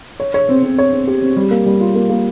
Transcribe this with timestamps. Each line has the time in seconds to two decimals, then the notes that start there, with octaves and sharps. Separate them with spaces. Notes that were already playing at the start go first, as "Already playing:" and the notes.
0.20 C#5
0.34 C#5
0.49 C4
0.63 C4
0.78 C#5
0.92 C4
1.07 G4
1.22 C4
1.36 G3
1.51 A#3
1.66 G3
1.81 F4
1.95 A#3
2.10 A#3